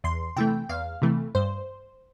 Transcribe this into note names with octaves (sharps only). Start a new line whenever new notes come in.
E2 C6
C3 E3 A3 G5
E2 F5
C3 E3 A3
G2 C5